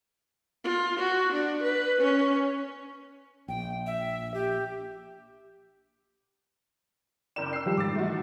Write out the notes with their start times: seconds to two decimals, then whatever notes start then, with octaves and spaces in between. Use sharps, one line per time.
0.65 F4
0.99 F#4
1.33 D4
1.63 B4
2.01 C#4
3.48 A#1 G5
3.86 E5
4.34 G4
7.36 F#1 D5 G5 E7
7.53 E6 C7
7.66 D#3 F3 G3 G4
7.77 G#2 D6 A6
7.95 E3 A3 D#4 F#4